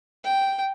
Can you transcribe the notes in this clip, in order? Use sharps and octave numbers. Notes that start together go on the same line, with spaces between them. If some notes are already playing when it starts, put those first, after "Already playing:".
G5